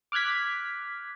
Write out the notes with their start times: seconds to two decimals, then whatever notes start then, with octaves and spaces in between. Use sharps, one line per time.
0.12 D6 F6 F#6 G#6 B6